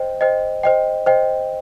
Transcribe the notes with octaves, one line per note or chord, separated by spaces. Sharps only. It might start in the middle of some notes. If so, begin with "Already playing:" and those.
Already playing: C5 D#5 G5
C5 D#5 G5
C5 D#5 G5
C5 D#5 G5